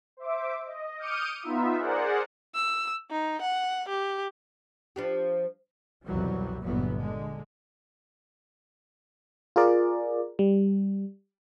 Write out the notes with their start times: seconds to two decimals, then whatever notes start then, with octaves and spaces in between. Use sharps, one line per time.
0.17 C5 E5 D6
0.65 D#5
0.97 D6 D#6 F6 G6 C#7 D#7
1.43 B3 D#4 F4 E5
1.79 G#4 A#4 C5 D5 F#5
2.55 E6
3.11 D#4
3.42 F#5
3.89 G4
4.96 F3 D4 G4
6.06 C2 F2 B2 E3 F#3 G3
6.63 G1 E2 A#2 E3 F#3 B3
6.99 D3 G#3
9.56 F4 G#4 A#4 D5
10.39 G3